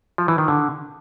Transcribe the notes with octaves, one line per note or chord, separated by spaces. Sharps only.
F3
E3
D#3
D3